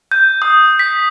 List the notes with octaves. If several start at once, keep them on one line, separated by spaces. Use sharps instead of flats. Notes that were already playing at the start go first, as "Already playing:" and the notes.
G6
D#6
B6